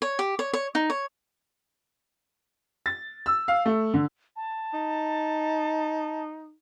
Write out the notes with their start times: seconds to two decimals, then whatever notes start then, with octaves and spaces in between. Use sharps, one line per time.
0.02 C#5
0.19 G4
0.39 C#5
0.53 C#5
0.75 D#4
0.90 C#5
2.86 A6
3.26 E6
3.48 F5
3.66 A3
3.94 D3
4.36 A5
4.74 D#4